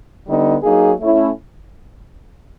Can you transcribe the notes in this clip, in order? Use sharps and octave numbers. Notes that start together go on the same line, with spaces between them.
D3 G3 B3 D#4
F#3 A#3 D#4 G#4
A3 C#4 E4